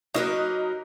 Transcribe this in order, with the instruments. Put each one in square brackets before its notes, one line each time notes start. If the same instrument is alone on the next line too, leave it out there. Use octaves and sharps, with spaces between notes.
[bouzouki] F#3 A#4 B4 [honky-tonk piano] A#3 D#4 D#5